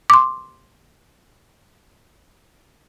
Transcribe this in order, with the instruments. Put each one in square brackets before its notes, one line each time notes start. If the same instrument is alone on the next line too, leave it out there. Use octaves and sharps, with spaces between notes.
[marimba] C6 D6